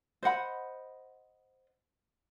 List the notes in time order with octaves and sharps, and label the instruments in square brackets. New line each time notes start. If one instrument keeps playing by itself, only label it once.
[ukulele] C5 D#5 F#5 B5